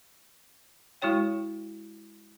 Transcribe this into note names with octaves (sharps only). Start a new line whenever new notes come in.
G#3 E4 F#4 C#5 G5